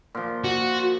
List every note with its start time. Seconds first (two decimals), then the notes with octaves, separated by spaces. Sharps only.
0.15 A#2 F3
0.44 F#4